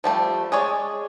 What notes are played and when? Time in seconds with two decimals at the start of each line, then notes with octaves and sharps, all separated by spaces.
0.04 F3 G3 A3
0.52 G#3 G#4 C#5 D5